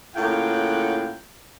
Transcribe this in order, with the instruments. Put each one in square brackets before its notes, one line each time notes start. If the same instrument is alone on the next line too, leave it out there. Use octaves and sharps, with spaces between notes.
[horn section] A2 C#3 A#3 F4 F#5 G5